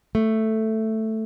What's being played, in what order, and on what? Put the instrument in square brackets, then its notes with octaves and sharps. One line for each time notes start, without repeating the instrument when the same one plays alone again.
[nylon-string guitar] A3